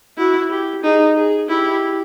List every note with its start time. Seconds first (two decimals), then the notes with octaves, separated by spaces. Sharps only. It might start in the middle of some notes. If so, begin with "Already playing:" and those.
0.18 E4 F#4
0.50 G4
0.83 D#4 G#4
1.16 G#4
1.48 E4 G4